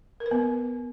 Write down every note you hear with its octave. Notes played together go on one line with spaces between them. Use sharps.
A#4
B4
B3